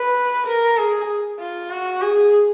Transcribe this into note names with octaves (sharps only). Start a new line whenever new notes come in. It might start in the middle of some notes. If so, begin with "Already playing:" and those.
Already playing: B4
A#4
G#4
F4
F#4
G#4